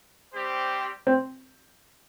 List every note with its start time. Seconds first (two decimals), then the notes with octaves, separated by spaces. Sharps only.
0.33 G3 C4 G4 C5
1.07 C4